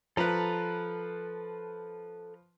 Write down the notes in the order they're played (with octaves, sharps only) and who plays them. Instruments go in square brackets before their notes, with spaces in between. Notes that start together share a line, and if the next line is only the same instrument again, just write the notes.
[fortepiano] F3 B4 [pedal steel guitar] A4 A#5 B5